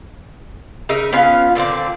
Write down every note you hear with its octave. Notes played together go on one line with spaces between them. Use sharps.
C#3 D#4 A#4 E5
B3 C#4 F4 F5
A#2 D3 C4 D5